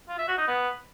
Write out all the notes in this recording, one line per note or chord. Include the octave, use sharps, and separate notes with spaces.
F4
E5
F#4
D#4
B3